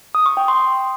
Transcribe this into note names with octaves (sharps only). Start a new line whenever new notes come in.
D#6
C#6
G5
C6